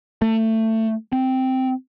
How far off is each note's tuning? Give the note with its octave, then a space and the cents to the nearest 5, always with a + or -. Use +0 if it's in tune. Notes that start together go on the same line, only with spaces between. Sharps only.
A3 +20
C4 -5